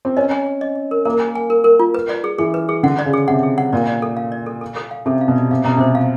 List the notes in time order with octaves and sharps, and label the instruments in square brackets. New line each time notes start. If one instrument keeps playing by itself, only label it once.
[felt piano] C4
[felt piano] C#4 [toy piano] D#5
[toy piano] G#5
G#5
D#5
D#5
A#4
[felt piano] A#3 [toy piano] A#4
[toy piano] G#5
G#5
A#4
A#4
F4
B4
D5
G#4
[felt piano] E3 [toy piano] G#4
[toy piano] B4
G#4
[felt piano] D3 [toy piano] F#5
[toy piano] D5
[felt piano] C#3
[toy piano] G#4
[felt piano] C3 [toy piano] F#5
[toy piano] G#4
F#5
[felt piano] A#2 [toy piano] D5
[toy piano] D5
A4
F5
D5
A4
A4
A4
F5
[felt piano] C3 [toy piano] A4
[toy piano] F5
[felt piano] B2
[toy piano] D5
[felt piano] C3 [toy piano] F5
[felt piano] B2 [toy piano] A#5
[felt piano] C3 [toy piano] C5
[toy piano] F5